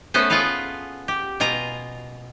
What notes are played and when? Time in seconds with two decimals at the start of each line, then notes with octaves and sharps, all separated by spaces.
0.14 A3 B3 C#4 B4 C5
0.30 F4 G#4 A4 B4 F5
1.08 G4
1.40 B2 F4 G#5 A#5